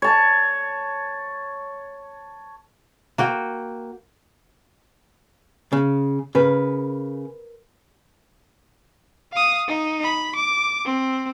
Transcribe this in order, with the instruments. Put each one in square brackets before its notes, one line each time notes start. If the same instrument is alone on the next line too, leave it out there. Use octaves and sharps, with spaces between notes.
[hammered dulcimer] C#5 A5
[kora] A#3 F#4 G5
[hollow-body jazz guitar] C#3
[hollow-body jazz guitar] C#3 [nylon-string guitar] A#4 B4
[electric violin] F5 D#6
D#4
B5
D6
C4